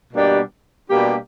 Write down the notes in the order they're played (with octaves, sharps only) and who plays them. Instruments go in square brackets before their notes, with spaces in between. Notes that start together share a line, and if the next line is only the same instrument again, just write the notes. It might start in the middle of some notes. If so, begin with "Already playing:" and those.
[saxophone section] B2 G3 A#3 D4 G4
B2 G3 A#3 D4 G4